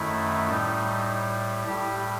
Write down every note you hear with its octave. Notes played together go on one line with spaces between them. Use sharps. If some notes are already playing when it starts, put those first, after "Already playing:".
Already playing: F#2 D#3 A3 E4
A2 G3 D#4
A2 G3 G4